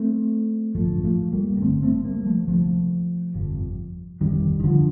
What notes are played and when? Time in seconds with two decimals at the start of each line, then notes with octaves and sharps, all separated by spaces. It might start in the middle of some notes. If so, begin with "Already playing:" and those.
Already playing: A3 C4
0.75 A1 G2 D3 F3 A3
1.04 F3 A3
1.33 G3 A#3
1.57 A#3
1.61 G1 G2 D3 A3 C4
1.83 A3 C4
2.05 G3 A#3
2.26 F3 A3
2.48 D2 C3 F3 A3
3.34 G1 F2 C3
4.20 G1 F2 C3 D#3 G3
4.60 D#3
4.64 D3 F3